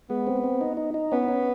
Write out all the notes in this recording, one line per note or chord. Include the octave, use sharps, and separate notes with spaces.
G#3 B3
C4
C4
D#4
D#4
D#4
B3 C#4
C#4